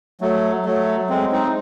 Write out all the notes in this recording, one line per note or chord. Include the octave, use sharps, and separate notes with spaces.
F#3 A3
F#3 A3
G#3 C4
C4 D#4